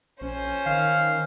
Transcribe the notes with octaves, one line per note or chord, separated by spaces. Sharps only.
A#1 C#4 C5
D#3 F5